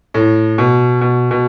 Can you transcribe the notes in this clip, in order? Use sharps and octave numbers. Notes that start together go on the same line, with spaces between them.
A2
B2
B2
B2